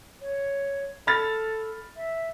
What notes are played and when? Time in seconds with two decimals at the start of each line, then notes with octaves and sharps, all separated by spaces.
0.22 C#5
1.07 A4 B5 F6 A6
1.97 E5